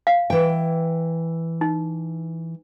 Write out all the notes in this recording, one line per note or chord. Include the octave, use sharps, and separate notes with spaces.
F5
E3 G5
D#4